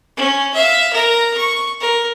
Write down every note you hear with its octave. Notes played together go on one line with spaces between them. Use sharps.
C#4
E5 F5
A#4 A#5
C#6
A#4